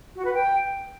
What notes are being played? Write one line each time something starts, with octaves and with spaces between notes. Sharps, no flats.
F#4
B4
G5